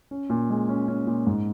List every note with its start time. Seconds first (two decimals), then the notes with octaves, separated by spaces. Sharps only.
0.11 C#4
0.30 A#2
0.50 G#3
0.69 C#4
0.88 C#4
1.07 A#2
1.27 G#2